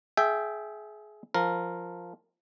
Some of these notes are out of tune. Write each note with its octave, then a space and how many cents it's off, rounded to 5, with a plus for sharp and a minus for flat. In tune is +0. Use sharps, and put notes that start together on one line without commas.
G#4 +25 E5 +0 G5 +0
F3 +0 A#4 -5